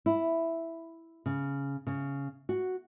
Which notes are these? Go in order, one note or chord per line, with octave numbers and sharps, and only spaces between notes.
E4
C#3
C#3
F#4